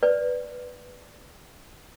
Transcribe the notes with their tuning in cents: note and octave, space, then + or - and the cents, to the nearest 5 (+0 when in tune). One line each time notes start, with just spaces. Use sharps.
B4 +0 D5 +0